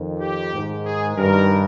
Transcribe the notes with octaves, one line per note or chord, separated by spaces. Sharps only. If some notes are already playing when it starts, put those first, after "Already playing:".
Already playing: F2 D#3
G4
G#2 D#3
G#4
G2 D#3 A#4